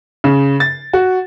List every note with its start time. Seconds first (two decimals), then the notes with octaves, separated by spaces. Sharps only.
0.24 C#3
0.60 A6
0.93 F#4